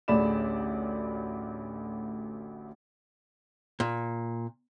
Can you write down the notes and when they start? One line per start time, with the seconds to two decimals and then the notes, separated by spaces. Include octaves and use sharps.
0.08 A1 D2 G#4 D5 B5 E7
3.80 A#2